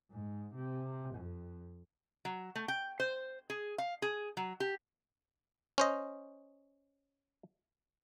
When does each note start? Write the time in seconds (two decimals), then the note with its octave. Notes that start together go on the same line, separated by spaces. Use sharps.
0.11 G#2
0.55 C3
1.15 F2
2.25 F#3
2.55 A3
2.68 G5
3.00 C5
3.50 G#4
3.78 F5
4.02 G#4
4.37 F#3
4.60 G4
5.78 C#4 C5 D#5